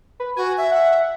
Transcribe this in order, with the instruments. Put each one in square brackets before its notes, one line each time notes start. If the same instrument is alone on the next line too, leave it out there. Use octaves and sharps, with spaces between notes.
[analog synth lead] B4
[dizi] F#4 [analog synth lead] G#5
[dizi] E5
[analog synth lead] F#5